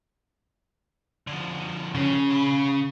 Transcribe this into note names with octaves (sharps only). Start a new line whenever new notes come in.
D3 F3
C#3
F5 B5